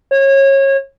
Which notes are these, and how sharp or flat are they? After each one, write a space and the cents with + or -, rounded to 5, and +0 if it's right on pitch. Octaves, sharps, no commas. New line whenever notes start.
C#5 -25